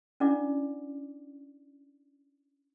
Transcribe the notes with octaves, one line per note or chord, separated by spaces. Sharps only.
C#4 D4 E4 D5 F#5 D6